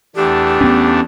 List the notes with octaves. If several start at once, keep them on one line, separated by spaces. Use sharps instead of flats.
E2 A3 D4 G4
B3 C#4